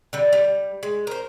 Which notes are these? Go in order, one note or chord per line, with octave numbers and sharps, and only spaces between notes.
D3 G3
G3
G#3
A#4 C5